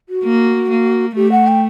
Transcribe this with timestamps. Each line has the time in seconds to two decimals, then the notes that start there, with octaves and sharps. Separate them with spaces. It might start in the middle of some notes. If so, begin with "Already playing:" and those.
0.09 F#4
0.24 A#3
0.70 A#3
1.16 A3 G4
1.32 F#5
1.47 G5